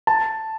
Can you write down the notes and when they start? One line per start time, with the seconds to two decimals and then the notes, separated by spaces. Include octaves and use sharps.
0.07 A5